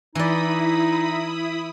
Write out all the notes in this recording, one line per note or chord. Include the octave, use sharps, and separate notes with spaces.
E3 D#4 E4 D5 B5 D#6